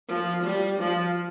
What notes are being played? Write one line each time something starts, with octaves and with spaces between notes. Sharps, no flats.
F3
G3
F3